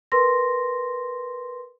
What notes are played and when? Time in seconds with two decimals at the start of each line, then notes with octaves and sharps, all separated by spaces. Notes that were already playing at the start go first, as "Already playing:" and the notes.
0.12 A#4 B4 C6 A#6